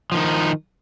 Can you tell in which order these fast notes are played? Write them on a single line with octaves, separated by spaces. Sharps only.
F3 D#3 D#4